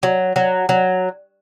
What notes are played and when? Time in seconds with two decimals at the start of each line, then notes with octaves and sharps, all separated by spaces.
0.03 F#3
0.36 F#3
0.69 F#3